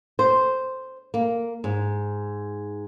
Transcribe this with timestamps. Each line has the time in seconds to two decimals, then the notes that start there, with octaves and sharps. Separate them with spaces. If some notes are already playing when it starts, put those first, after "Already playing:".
0.19 C5
1.14 A#3
1.64 G#2